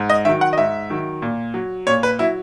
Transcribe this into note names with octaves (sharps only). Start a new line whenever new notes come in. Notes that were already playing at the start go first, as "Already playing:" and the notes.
Already playing: G#2
D#5
D#3 F#3 E5
F#5
D#5
G#2 E5
D#3 F#3
A#2
F#3
A#2 C#5
B4
F#3 E4